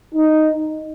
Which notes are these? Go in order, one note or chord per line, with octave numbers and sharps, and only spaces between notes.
D#4